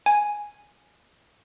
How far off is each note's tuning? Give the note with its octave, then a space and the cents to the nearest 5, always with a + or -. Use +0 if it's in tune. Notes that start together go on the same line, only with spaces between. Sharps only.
G#5 +0